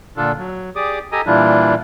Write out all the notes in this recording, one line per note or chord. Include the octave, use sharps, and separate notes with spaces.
A#2 D3 D4 F4 A4
F#3
G4 G#4 D5 D6 D#6
G4 A4 D#5 G#5 A#5 D#6
A#2 E3 G3 D4 E4 F4